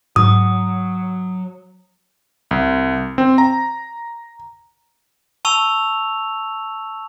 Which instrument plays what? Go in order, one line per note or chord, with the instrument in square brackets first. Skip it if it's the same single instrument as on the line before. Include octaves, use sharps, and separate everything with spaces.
[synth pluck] G#2 [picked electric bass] F#3 [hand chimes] D#6
[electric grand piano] C2
C4
A#5
[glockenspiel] A5 C#6 E6 F7